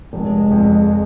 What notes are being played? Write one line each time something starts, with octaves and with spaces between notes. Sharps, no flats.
F1 G#3
F2